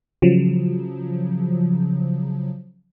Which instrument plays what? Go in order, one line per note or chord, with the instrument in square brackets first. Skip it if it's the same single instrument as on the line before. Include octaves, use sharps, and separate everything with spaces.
[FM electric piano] C#3 F3 F#3